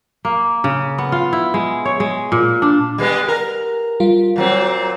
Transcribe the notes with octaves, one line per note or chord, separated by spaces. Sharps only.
A#3
C#3
B3
F4
E4
G#3
C#5
G#3
A#2
D4
G3 G#3 B3
A#4
G3 F4
A#2 F#3 C4